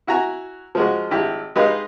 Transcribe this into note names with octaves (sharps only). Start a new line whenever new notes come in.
E4 F#4 G#5 A#5
F3 G#3 F#4
G#1 E4 G4
G#3 D#4 G4 B4 D#5 F5